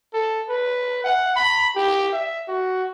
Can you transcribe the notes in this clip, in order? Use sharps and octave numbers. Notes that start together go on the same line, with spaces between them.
A4
B4
F#5
B5
G4
E5
F#4